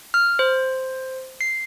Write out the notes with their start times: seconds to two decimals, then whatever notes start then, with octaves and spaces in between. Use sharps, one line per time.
0.14 F6
0.39 C5
1.41 C7